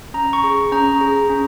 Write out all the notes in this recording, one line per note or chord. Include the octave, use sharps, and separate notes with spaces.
C#4 A#5
C#6
G#4
C#6
C#4 A#5
G#4
C#4